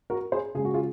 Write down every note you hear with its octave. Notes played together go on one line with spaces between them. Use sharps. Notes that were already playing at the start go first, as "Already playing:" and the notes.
F#4 A#4
G#4 C5
C#3 G#3 G#4
F#4
F4 G#4